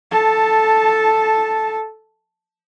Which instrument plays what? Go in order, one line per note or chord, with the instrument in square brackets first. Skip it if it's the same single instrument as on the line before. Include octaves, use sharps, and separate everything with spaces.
[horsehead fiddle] A4 A5